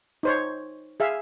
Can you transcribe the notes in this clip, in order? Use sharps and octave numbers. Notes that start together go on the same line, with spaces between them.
D#4 C5 C#5
G#4 E5 F5